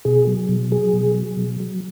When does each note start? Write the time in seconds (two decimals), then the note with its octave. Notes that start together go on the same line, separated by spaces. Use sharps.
0.05 B2 G#4
0.27 F#3
0.49 B2
0.71 F#3 G#4
0.93 B2
1.15 F#3
1.37 B2
1.60 F#3